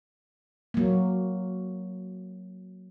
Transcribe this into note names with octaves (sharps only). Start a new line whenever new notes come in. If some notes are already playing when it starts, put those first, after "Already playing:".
F#3 A#3